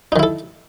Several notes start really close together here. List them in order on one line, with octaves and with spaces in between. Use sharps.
D#4 D#3 E4 A4